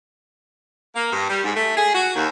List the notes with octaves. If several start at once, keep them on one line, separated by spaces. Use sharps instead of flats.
A#3
G2
G3
G#2
A3
G#4
F#4
D#2